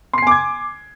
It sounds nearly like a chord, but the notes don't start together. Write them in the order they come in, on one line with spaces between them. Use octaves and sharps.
C6 C7 G#5 D6 G#6